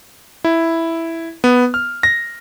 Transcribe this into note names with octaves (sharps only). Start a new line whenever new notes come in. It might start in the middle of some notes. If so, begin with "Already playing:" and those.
E4
B3
F6
A#6